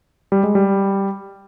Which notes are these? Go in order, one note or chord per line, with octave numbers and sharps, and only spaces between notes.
G3
G#3
G3